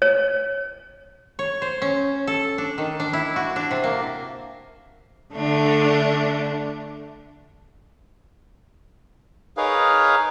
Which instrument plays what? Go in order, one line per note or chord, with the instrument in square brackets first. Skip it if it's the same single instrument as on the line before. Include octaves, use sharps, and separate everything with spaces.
[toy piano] C#5
[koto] C#5
C5
C#4
A4
D4
D#3
D4
E4
F#4
D4
C3
A#3
[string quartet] D3 A3 D4
[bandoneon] D#4 G#4 A#4 B4 C#5 F5